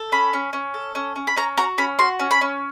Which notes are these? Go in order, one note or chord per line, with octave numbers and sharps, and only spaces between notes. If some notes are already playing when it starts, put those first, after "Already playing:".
Already playing: A4
C#4 B5
C#4
C#4
A4
C#4
C#4
B5
C#4 A#5
F#4 A#5
C#4 B5
F#4 C6
C#4
B5
C#4